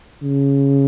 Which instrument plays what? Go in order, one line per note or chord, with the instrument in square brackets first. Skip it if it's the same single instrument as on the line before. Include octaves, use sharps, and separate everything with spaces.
[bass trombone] C#3